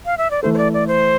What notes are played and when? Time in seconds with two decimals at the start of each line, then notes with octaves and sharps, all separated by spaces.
0.05 F5
0.18 E5
0.31 D5
0.43 E3 A3 E4 A4 C5
0.54 C5
0.58 D5
0.74 D5
0.87 C5